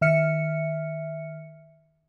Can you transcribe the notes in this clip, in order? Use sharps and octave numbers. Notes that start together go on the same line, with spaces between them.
D#3 E5 F6 C#7